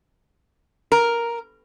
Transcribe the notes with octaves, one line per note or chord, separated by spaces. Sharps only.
A#4